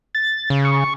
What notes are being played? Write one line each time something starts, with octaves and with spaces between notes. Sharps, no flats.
A6
C#3
C#6